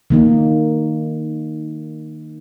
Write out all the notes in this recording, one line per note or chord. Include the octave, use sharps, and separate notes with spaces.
D#3 A#3 D#4